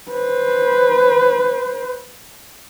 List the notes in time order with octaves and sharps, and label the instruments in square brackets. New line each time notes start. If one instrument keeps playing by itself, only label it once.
[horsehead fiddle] B4 C5